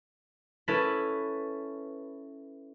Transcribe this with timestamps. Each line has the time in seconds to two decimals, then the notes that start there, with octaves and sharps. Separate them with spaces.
0.68 C#4 E4 A4 B4